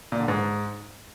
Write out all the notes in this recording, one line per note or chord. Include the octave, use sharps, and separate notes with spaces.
A#2
D3
G#2